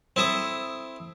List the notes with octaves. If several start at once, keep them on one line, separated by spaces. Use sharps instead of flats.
C4 E4 A4 D#6